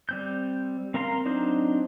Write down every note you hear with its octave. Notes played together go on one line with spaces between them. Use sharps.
G3 C4 G6
C4 A#4 F5 A#5 C6
F#3 C4 D4 D#4 C5